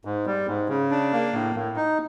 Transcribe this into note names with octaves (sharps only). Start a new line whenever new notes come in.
G#2
G3
G#2
C#3
D4
A#3
A2
A2
D#4